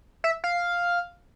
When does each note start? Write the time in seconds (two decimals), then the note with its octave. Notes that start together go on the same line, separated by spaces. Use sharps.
0.24 E5
0.44 F5